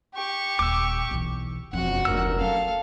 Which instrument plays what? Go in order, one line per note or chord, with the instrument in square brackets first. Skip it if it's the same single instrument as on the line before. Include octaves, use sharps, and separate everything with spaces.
[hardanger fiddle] G4 C#6
[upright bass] D#1 [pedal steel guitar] D6 E6
[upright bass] B1 E3
[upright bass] E1 F2 [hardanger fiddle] F#4 F#5
[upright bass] F1 D2 [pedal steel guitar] A#4 E6
[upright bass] F#3 C#4 [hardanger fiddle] A4 F5